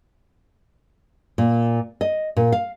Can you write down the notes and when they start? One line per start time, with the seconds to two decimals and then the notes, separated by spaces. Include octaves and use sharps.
1.38 A#2
2.01 D#5
2.37 A#2
2.52 F5